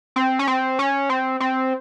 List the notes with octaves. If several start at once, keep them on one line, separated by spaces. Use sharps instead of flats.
C4
C#4
C4
C#4
C4
C4